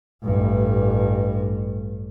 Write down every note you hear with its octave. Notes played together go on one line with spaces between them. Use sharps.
A1 G2